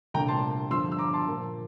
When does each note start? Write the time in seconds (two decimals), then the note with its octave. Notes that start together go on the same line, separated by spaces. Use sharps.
0.14 C2 A#2 A3 D4 G5 A#5
0.28 A5 C6
0.71 G2 D3 F3 C6 E6
0.92 E6
0.98 A#5 D6
1.13 A5 C6
1.27 A#2 F3 A#3